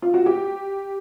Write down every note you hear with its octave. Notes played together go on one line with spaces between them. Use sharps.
F4
F#4
G4